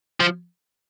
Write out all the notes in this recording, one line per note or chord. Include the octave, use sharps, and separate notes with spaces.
F3